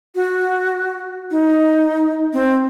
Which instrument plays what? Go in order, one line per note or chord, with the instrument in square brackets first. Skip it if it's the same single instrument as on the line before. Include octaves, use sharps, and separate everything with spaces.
[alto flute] F#4
D#4
C4